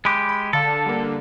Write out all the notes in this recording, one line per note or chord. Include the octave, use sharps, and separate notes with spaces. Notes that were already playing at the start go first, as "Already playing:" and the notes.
G#3 G4 B5 D6 F#6
B5
D3 A4 F5 A5
G3 A#3